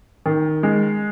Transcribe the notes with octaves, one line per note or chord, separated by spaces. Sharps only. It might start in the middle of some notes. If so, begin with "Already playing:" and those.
D#3
G#3